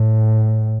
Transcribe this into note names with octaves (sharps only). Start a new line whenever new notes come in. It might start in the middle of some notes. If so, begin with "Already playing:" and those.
Already playing: A2